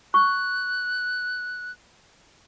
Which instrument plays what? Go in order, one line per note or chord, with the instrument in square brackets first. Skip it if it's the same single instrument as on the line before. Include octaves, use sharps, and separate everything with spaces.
[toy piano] C#6 [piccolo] F#6